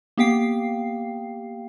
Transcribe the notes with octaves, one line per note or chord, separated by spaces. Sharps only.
A#3 B3 G4 F5 G5 C7